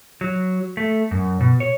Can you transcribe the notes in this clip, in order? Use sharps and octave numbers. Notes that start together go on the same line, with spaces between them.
F#3
A3
F#2
B2
C#5